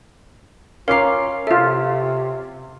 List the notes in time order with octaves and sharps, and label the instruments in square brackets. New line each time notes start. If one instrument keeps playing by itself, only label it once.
[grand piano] C#4 D6 C7 [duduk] F4 [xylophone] A#4 A#5 [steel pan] F5
[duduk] C3 [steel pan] F4 A4 [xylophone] E5